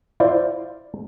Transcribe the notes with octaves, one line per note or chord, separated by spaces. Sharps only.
E4 F4 C5 D5